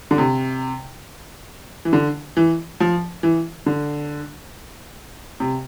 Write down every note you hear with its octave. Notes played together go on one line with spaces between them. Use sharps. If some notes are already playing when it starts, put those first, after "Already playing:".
D3
C3
E3
D3
E3
F3
E3
D3
C3